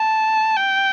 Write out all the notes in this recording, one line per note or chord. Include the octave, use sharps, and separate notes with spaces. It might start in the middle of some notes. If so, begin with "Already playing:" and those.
Already playing: A5
G5